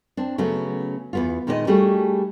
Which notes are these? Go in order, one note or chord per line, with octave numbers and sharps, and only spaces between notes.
C4 D4
C#3 F#3 A3 B3
E2 B3 F4
A#2 D#3 G#3 B3 C5 D#5
G3 A3 D4 F#4 G#4